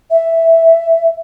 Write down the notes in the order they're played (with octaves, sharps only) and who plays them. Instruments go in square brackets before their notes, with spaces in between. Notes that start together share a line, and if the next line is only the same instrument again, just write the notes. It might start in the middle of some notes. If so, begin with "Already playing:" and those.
[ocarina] E5